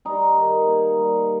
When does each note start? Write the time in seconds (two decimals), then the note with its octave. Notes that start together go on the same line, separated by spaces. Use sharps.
0.05 G3 D#4
0.36 D#3
0.67 A#3
0.98 G3